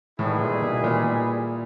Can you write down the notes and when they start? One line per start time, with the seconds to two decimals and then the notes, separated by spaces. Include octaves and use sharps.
0.19 A2 D#3 G3 B3 E4 G#4
0.41 A#2
0.62 B2
0.84 A#2